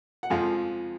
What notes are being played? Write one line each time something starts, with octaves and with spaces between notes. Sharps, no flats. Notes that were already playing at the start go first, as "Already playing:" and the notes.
F#5
F2 F3 G#3 F5